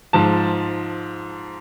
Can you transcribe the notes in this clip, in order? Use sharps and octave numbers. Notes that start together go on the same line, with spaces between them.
G#2 F3 A5